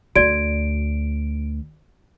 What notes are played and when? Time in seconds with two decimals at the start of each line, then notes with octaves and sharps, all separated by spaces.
0.16 D2 A3 F#4 D5 D7